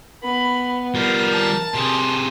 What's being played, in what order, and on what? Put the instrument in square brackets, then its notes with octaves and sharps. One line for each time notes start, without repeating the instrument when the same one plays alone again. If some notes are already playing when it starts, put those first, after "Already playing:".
[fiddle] B3 [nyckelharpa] B5
[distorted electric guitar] G3 F4 [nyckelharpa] A#4 A#5
[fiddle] A5
[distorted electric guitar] C3 G#4 [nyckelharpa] C6